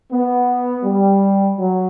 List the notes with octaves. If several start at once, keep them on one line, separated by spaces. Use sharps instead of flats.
B3
G3
F#3